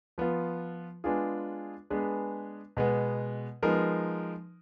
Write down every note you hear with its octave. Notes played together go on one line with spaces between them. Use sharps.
F3 B3 F4
G#3 B3 D4 F4 G#4
G#3 B3 D4 G#4 B4
B2 G#3 B3
F3 G#3 B3 D#4 A#4